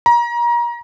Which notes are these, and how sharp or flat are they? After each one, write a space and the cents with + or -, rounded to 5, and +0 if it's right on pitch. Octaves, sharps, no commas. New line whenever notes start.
A#5 +30